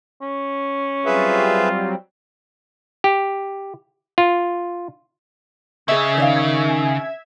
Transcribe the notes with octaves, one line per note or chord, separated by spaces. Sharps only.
C#4
F#3 G3 C4 F4 G#4 B4 E5
G4
F4
C#3 G#4 D#5 E5 E6 G#6
D#3 D5 D#5 F5